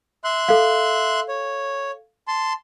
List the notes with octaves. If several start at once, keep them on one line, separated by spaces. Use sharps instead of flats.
E5 C6 F#6
A4 F5
C#5
A5 C6